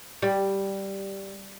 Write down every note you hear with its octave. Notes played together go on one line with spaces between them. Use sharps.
G3